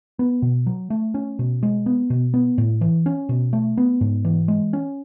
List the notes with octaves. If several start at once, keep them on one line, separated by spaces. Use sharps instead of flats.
B3
B2
F#3
A3
C#4
B2
G#3
B3
B2
B3
A2
E3
C#4
B2
A3
B3
G#2
E3
G#3
C#4